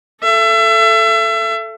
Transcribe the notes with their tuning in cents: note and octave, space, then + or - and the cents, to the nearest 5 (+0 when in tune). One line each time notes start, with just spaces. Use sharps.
A4 +0 E5 +35